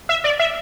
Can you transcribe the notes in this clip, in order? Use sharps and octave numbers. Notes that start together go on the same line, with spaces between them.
E5
D5
E5